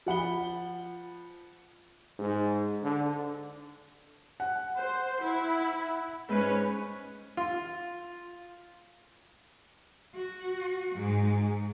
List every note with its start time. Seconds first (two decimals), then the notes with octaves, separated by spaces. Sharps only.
0.06 F3 F#5 B5 G7
2.19 G#2
2.82 D3
4.40 F#5
4.78 C5
5.22 E4
6.29 G#2 G#3 C#4 B4
7.37 F4
10.14 F#4
10.94 G#2